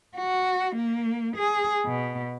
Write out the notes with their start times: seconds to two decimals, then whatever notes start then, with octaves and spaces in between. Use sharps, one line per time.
0.17 F#4
0.76 A#3
1.37 G#4
1.85 B2